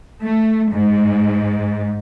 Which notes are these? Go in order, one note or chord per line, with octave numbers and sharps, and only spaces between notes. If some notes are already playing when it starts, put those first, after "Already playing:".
A3
G#2